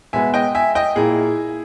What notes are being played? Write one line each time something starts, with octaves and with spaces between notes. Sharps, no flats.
B2 G#3 B3 E5 G#5
D#5 G5
E5 G#5
D#5 G5
A#2 A#3 E4 G#4